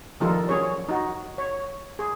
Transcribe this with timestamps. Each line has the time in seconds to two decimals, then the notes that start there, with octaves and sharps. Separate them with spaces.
0.20 D#3 F3 G3 D#4 F4 A4
0.49 F#3 G3 C#4 G#4 C#5
0.89 D#4 F#4
1.38 C#5
1.99 G#4